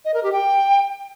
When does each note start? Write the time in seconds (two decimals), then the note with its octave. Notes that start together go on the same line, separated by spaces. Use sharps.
0.05 D#5
0.14 A#4
0.23 G4
0.32 G5